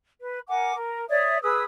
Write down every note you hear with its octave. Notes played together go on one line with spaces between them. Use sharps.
B4
A#4 F#5 G#5 D6
A#4
C#5 D5 E5 D#6
G#4 B4 D#6 E6